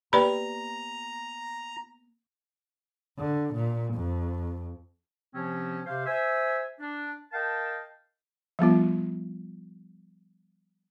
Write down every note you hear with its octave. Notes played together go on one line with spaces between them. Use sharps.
A#3 B3 G4 B4 D5 G5 A#5 B5
D3
A#2
F2
C3 F3 C4 C#4
C3 C5 F5
C5 E5 G#5
D4
A#4 D#5 F5 G5 A5
F3 G3 B3 F4